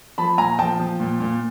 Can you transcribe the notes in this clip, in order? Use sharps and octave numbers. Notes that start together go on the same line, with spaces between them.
F3 A5 B5
A#2 G#5 A#5
F3 G5 A5
F3
A#2
A#2